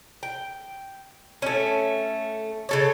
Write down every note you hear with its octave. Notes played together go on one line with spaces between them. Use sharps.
G5
A3 C#4
C#3 A4 C#5